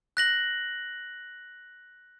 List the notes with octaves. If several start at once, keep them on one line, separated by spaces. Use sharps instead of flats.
F#6 A#6 F#7